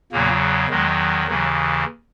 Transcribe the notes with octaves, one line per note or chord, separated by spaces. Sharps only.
E2 A#2 C#3 F#3 A#3
E2 D#3 F#3 G#3
D#2 C#3 E3 F#3